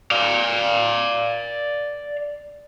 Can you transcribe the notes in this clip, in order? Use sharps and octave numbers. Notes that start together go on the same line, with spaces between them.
D5 F5